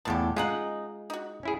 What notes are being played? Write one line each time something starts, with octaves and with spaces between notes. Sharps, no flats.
E2 A2 F3 G3 G4 A5
G#3 C#4 D#4 F4 F#5
D#4 F#4
C#4 E4 G#4